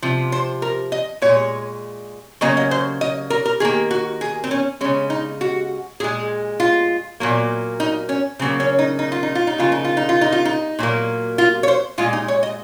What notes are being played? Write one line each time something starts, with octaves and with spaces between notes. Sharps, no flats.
C3 F3
C5
A#4
D#5
A#2 G#3 C#5
C#3 F#3 A#3 D#5
D#5
C5
D#5
A#4
A#4
D#3 A#3 G#4
F#4
G#4
C4
C#4
C#3 G#3 C#4
D#4
F#4
A#2 G#3 G#4
F4
A#2 F#3 A#3
D#4
C#4
C#3 F#3 A#3 C4
C#4
D#4
D#4
F4
D#4
F4
D#4
C#3 F3 A#3 F4
D#4
F4
D#4
F4
D#4
F4
D#4
A#2 F#3 A#3
F4
C#5
C5
A#2 G#3 F4
D#4
C#5
D#5